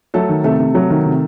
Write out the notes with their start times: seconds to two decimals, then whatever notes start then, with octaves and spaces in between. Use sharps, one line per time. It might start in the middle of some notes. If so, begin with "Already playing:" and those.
0.14 F#3 A3 A4
0.29 D#3
0.44 C3 A3 A4
0.60 C3
0.75 F#3
0.90 D#3
1.06 C3